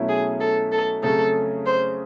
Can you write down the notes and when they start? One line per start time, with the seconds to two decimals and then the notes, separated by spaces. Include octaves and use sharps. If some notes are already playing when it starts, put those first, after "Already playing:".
Already playing: B2 F#3 A3 C#4 E4
0.09 G#4
0.40 A4
0.72 A4
1.03 F2 C#3 F#3 A3 C#4 A4
1.66 C5